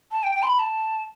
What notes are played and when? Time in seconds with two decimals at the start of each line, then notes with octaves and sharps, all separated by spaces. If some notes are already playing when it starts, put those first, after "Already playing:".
0.12 A5
0.23 G5
0.35 G5
0.42 C6
0.47 B5
0.59 A5